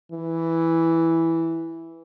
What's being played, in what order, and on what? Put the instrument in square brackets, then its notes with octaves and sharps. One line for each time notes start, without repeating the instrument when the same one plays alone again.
[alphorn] E3